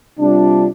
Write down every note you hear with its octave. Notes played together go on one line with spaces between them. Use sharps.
C3 G3 D4 F4